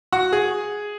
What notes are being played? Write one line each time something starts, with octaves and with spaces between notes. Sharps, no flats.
F#4
G#4